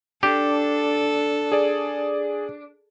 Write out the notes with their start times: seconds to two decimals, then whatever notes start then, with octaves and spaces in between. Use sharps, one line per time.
0.23 D4 G4 A4
1.52 G#4 D5